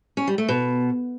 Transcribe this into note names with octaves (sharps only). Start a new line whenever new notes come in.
C#4
G3
A3
B2